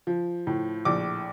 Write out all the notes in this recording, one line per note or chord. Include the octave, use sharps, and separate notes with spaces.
F3
A2
A#1 D6